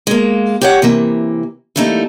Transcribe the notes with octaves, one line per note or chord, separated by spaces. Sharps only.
G#3 A#3
G4 C#5 F#5
C3 E3 A#3
E3 G3 A3 A#3 D#4